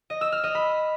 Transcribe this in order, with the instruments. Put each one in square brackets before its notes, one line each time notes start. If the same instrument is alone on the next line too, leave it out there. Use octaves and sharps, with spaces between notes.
[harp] D#5
E6
F6
D#5
B5